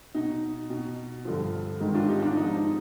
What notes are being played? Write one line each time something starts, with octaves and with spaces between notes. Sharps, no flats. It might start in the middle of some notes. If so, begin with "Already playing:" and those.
B2 D#4
B2
G2 D3 F3
G#2 D#3
D4 F4
D#4 G4
D4
G#2 F3 D#4
D#4